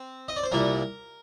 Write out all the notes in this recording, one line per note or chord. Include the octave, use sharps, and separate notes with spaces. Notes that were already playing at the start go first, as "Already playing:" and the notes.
Already playing: C4
D#5
D5
C5
C2 A#2 G3 A#3 A#4